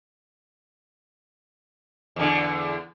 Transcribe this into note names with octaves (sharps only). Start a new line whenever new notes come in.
E2 D3